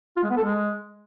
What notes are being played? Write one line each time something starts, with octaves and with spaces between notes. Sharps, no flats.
F4
G#3
B3
A4
G#3